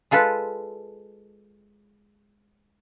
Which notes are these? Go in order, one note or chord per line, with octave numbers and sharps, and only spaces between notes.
G#3 F4 A4 B4